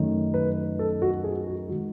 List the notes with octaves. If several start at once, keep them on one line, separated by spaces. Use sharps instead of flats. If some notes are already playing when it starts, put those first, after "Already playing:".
Already playing: F#2 D#3 A3 C#4
B4
A4
F#4
G#4
F#4
D#3 G#3 F#4